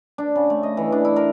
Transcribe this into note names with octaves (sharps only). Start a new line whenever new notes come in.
D4
C#3
A3
D#5
E3
D4
E4
A#4